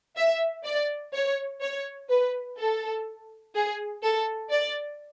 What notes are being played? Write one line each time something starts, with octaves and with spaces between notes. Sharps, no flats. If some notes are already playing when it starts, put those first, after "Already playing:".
E5
D5
C#5
C#5
B4
A4
G#4
A4
D5